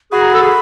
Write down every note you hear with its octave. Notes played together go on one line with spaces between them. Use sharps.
F#4 G#4 B5
A#5
A4 B5
G#4